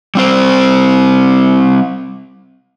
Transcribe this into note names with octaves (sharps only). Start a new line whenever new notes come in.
G3 C4 C5